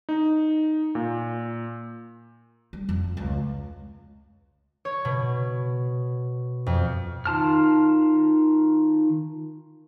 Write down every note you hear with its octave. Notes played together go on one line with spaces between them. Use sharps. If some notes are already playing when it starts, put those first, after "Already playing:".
D#4
A#2
G3
F2
C#2
C#5
B2
F2
D#3 F4 A5 F6